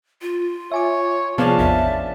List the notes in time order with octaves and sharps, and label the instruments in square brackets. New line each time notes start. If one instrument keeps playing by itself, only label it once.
[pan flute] F4
[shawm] C#5 [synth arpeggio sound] E5 G#5 D6
[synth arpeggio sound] C3 B3 [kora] F3 C#4 D4 [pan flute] G#4 [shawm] A5
[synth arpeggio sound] A1 E2 [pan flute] E5